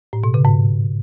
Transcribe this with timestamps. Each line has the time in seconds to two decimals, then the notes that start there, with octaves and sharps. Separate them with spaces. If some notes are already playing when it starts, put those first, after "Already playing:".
0.13 A2
0.24 B2
0.34 C#3
0.45 G#2